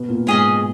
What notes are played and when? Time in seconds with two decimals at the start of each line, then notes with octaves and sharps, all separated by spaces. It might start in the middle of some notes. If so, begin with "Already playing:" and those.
Already playing: B2 B3
0.09 A#2 A#3
0.27 G#2 G#3 C#4 G#4 D#5